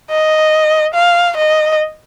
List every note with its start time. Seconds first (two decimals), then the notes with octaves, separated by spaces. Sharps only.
0.10 D#5
0.94 F5
1.37 D#5